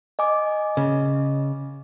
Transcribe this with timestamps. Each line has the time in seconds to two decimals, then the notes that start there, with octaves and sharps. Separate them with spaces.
0.19 D#5 G#5 D6
0.77 C#3